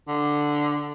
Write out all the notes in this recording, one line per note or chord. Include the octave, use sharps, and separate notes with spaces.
D3